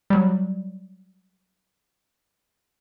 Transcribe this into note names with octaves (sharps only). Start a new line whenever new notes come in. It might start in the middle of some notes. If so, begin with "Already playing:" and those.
F#3 G3